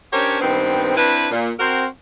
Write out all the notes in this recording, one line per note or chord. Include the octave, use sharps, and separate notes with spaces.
C#4 D4 G4 A#4 C5 C#5
G2 D#3 B3 C4
C4 D4 E4 B4
A#2
C4 F#4 A#4